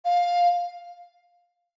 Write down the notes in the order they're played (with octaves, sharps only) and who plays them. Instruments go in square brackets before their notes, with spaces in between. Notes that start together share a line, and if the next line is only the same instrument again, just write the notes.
[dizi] F5